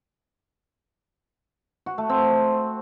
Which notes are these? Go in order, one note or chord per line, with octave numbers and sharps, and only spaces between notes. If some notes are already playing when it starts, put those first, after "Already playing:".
F#4
A3
C4